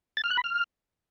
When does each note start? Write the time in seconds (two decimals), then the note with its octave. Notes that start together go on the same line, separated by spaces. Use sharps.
0.17 A6
0.24 F6
0.30 F#6
0.37 B5
0.44 F6